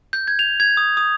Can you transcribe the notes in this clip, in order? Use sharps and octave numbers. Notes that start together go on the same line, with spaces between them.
G6
G#6
F7
G#6
D#6
D#6